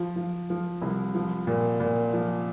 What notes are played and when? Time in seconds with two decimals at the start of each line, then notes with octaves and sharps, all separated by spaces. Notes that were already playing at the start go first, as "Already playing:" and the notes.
Already playing: F3
0.16 F3
0.50 F3
0.82 C2
1.15 F3
1.47 A#2
1.80 A#2
2.13 F3